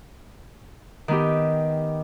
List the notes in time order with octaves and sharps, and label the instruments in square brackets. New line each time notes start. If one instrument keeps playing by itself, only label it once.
[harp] D#3 B3 G4